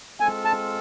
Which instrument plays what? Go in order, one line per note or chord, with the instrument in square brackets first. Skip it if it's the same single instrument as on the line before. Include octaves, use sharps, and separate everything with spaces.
[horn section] G#3 C4 F4 A4 [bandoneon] G#5
[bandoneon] A5